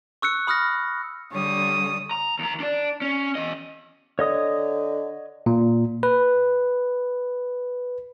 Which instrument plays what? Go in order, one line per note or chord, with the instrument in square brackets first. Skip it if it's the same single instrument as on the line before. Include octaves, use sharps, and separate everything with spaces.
[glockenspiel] C#6 E6 F#6 C#7
B5 D#6 F6 F#6 A#6
[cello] D3 G3 [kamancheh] C#5 D#6
[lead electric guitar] A#5
D#2 A#5
D4 D5
C#4
E2 D#5
[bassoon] D3 [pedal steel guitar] C#5 D#5 D#6
[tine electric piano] A#2
B4